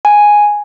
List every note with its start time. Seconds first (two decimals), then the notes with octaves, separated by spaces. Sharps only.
0.05 G#5